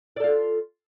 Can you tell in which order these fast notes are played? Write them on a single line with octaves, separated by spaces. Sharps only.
D5 A4 F4